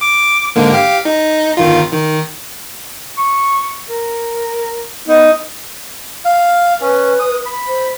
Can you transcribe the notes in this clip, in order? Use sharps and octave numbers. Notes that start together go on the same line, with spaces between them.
D6
G#2 D3 A#3
G4 F5
D#4
G1 D#3 F4
D#3
C#6
A#4
B3 D#4
F5
C#4 B4
D#6
B5
C5